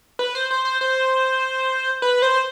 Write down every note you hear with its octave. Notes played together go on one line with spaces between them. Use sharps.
B4
C5
C5
C5
C5
B4
C5